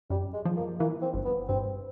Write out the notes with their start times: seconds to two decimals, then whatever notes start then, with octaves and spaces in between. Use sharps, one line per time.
0.10 F#2 G3
0.34 G#3
0.45 F3
0.57 A#3
0.80 E3 A#3
1.02 C4
1.14 G1
1.25 B3
1.49 G2 C4